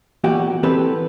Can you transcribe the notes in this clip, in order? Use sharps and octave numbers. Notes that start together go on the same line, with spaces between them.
E2 A#2 F#4 G4
E3 C4 G4 A4 B4